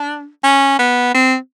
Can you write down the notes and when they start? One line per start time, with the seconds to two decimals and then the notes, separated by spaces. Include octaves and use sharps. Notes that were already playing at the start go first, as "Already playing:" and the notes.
Already playing: D4
0.44 C#4
0.79 B3
1.14 C4